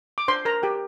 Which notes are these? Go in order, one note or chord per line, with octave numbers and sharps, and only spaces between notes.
D6
D4 C5 C6
A#4 A#5
G4 A#4 G5